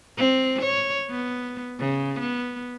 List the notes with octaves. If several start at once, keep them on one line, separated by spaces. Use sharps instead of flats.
C4
C#5
B3
C#3
B3